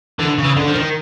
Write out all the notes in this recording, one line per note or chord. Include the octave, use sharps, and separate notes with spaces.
D3 E3
C#3
E3
D3
F3
D#3